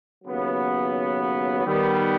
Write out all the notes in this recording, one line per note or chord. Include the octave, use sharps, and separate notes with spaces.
D#2 C#3 F#3 B3
D#3 G3 B3